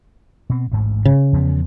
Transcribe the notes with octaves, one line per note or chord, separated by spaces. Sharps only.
B2 C4
A1 D2 G#2
C#3
E2 F3 B3